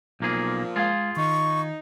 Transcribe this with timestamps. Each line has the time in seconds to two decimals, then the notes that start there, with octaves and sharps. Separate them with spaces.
0.20 B1 A#2 F3 A#3 G#4
0.76 G#3 F4 G#4 F5
1.17 D#3 D#4 C#6